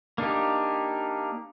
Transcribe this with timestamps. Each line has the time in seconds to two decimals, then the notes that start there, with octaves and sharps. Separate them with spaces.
0.18 A#3 D4 D#4 G4